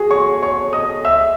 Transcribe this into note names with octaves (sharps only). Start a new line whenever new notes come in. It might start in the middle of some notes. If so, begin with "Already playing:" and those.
Already playing: F#4 G#4
C#5 C#6
C#5 C#6
D#5 D#6
E5 E6